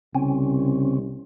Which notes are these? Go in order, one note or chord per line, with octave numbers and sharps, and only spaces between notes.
C2 C#3 C4 C#4